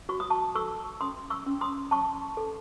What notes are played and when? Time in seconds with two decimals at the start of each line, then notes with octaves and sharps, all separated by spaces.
0.09 F#4 C#6
0.20 D#6
0.30 A5 C#6
0.55 A4 C#6 E6
1.01 C#4 C6 D#6
1.30 C#6 E6
1.46 C#4
1.61 C6 D#6
1.91 C#4 A5 C#6
2.37 A4